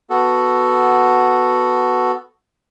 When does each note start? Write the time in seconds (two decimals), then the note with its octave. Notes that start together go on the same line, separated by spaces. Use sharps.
0.10 B3 F#4 A4